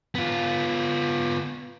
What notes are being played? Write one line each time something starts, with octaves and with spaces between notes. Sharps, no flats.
B3 F4